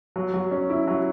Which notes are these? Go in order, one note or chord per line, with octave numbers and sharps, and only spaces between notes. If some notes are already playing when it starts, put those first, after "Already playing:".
F#3
F#3
C#4
E4
F#3